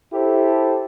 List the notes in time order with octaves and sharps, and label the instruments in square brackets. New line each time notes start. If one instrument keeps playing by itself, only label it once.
[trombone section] E4 G4 A4 C5